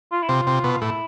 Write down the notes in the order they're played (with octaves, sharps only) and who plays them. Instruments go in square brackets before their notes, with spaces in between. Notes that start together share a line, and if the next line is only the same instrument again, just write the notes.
[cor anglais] F4
E4
[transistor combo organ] C3 [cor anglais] F4
[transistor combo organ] C3
B2
[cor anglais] F4
[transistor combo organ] A2 [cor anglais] E4